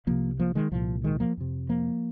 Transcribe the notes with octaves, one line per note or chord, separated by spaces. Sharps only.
C2 C3 F3 A#3
F3 A#3
D#3 G#3
C2 A#2 F3
D#3 G#3
F3 A#3
F2 C3
F3 A#3